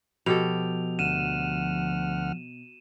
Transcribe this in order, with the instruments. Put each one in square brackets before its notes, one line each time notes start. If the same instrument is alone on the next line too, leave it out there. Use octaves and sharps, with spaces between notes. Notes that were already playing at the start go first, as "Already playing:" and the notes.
[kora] B2 G4 A4 [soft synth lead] F3 [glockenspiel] F7
[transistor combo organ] D2 F#5 F6 [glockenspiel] D#7 E7